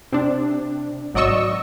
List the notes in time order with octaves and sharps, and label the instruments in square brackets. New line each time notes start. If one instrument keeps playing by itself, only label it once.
[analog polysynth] C3 D4
G#1 F#3 D5 D#5 C#6 E6